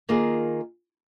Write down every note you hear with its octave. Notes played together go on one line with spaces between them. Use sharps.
D#3 A#3 F4 G#4